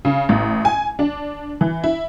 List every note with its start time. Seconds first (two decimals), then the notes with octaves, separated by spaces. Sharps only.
0.05 C#3
0.29 A1
0.65 G#5
0.99 D4
1.61 E3
1.84 E4